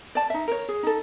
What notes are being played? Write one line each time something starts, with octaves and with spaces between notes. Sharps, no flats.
D5 A5
D#4 E5
A#4 C#5
G#4
D#4 A4